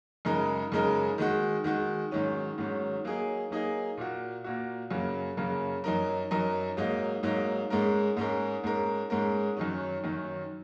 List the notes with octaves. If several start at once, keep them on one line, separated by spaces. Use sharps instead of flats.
F#2 C#3 G#3 D#4 A#4
F#2 C#3 G#3 D#4 A#4
D#3 G#3 F#4
D#3 G#3 F#4
G#2 D#3 F#3 C#4
G#2 D#3 F#3 C#4
F#3 A#3 D#4 G#4
F#3 A#3 D#4 G#4
A#2 A#3 F#4
A#2 A#3 F#4
F#2 C#3 F#3 A#3
F#2 C#3 F#3 A#3
F#2 F#3 D#4 A#4
F#2 F#3 D#4 A#4
G#2 F#3 A#3 D#4
G#2 F#3 A#3 D#4
G#2 G#3 C#4 A#4
G#2 G#3 C#4 A#4
G#2 G#3 C#4 A#4
G#2 G#3 C#4 A#4
F#2 D#3 F#3 C#4
F#2 D#3 F#3 C#4